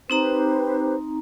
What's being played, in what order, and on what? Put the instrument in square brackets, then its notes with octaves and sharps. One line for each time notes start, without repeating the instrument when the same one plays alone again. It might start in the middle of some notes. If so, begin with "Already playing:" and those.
[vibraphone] C4 D#4 A#5 [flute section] G4 B4 C5